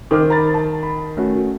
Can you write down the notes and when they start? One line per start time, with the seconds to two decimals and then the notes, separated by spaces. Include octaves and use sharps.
0.11 D#3 C5 D6 F6
0.30 A#5 B5 A6
0.54 A5
0.83 B5
1.17 A3 C#4 F#4